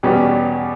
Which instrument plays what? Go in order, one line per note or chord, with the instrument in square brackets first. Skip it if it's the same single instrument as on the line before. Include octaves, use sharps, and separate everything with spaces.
[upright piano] E2 B2 G3 C#4 G4